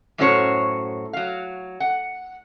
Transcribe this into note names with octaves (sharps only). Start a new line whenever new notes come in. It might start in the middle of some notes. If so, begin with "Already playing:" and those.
F#2 A2 C#4 F#4 C5 C#5
F#3 F5
F#5